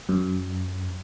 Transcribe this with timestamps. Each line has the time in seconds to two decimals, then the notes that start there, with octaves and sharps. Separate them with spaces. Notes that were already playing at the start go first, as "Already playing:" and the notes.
0.09 F#2